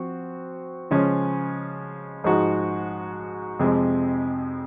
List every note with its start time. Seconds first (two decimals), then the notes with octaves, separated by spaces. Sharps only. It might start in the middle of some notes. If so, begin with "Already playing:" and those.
Already playing: F3 C4 F#4
0.91 C#3 F3 G#3 C#4
2.24 G#2 F3 G#3 D#4 F#4
3.59 F2 C3 F3 G#3